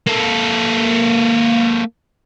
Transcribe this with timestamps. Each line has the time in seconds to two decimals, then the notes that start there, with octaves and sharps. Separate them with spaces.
0.07 A#3 A4